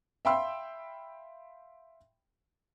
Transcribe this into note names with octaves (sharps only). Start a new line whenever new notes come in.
E5 F5 G5 B5 C6 E6